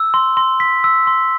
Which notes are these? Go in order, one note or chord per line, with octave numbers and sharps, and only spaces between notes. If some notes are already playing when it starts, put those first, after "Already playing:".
Already playing: E6
C6
C6
B6
E6
C6